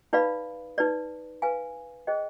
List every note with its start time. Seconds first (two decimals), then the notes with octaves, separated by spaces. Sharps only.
0.13 D#4 B4 D5 F5 B5
0.78 D#4 B4 D5
1.42 B4 F5 G#5
2.07 G#4 C5 D#5 G5